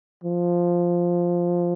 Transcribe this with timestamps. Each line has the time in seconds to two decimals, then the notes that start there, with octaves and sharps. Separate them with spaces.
0.24 F3